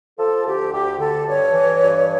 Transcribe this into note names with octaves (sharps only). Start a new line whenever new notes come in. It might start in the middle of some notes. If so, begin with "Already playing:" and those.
F3 A4
D2 G4
D2 G4
D3 A4
G2 C#5
E3
G2